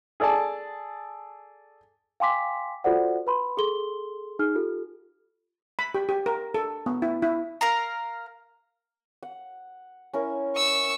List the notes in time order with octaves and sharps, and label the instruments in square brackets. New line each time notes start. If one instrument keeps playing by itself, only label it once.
[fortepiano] G#4 A4 D5 G#5 A5
[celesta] F5 G5 G#5 C6 D6 B6
F4 F#4 A4 C5 D5 F#5
B4 B5 C6
G#4 A4 C6 G7
D#4 G#4 F6
F4 G4 A4
[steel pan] B5
G4
G4
A#4
A4
B3
E4
E4
[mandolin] A#4 F5 A#5
[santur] F#5
C#4 E4 A#4
[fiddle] C#6 E6